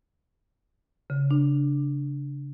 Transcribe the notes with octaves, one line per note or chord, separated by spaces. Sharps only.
C#3
D4